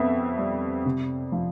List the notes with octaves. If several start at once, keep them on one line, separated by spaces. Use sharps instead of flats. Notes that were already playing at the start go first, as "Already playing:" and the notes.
Already playing: F2 B3 E5
G3
C3
F3